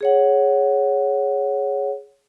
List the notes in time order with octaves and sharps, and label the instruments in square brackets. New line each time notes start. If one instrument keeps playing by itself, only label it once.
[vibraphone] G#4 C#5 F#5